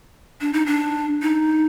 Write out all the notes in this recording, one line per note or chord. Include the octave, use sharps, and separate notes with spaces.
D4
D#4
D4
D#4